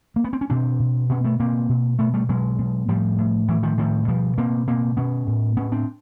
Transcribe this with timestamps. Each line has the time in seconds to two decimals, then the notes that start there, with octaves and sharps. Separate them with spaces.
0.16 A#3
0.24 B3
0.33 C4
0.41 C#4
0.50 B2 C4 D4
0.80 B2
1.09 B2 B3 C#4
1.24 A3 B3
1.40 B2 A#3 C4
1.69 B2
1.99 B2 A3 B3
2.14 G3 A3
2.29 B2 F#3 G#3
2.59 B2
2.88 A2 F3 G3
3.18 A2
3.48 A2 E3 F#3
3.63 D#3 F3
3.78 A2 D#3 F3
4.08 B2 F3 G3
4.38 B2 A#3 C4
4.67 B2 A#3 C4
4.97 B2 B3 C#4
5.27 A2
5.57 A2 B3 C#4
5.72 C4 D4